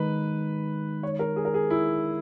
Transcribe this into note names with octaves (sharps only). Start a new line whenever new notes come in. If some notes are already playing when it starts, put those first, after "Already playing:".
Already playing: D#3 G#3 D#4 B4
C#5
A#4
G#4
A#4
G#4
E4